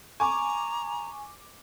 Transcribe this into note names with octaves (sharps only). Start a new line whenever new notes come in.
G#5 A#5 C#6 D6